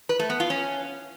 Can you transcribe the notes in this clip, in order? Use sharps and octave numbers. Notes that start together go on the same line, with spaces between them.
B4
A3
B3
F4
C#4